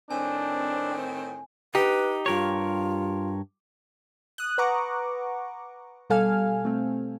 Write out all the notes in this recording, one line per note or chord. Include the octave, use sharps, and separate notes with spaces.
A2 D#3 C4 D4 G#5
D#4 G4 B4
G2 F4 A#4 C#5
D#6 F#6
B4 F#5 A#5 C#6 D6
B2 G3 A4 F5 G#5 F6
A3 C4